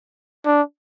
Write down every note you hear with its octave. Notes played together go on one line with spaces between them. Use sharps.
D4